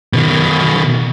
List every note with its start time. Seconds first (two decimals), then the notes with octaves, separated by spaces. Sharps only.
0.13 B2 D#3